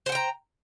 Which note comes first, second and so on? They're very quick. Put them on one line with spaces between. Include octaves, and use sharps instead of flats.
C5 F#5 G5 A#5